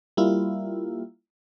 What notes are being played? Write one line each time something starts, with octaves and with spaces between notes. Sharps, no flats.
G3 A#3 E4 F4